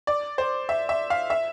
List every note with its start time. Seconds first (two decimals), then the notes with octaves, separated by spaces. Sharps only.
0.07 D5
0.38 C5
0.69 E5
0.89 E5
1.10 F5
1.30 E5